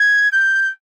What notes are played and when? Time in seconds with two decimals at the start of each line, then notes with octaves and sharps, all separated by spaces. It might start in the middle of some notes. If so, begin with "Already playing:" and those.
Already playing: G#6
0.31 G6